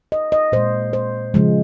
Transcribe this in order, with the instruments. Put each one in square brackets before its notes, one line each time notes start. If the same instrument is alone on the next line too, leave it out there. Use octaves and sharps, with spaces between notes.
[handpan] D#5
D#5
A#2 G#3 C5
C5
C#3 F3 G#3